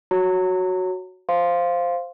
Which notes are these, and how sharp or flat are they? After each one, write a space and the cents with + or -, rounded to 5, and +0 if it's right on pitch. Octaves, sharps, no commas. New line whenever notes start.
F#4 +0 C#5 +0 A#5 -35
C5 +0 F5 +0 C6 +0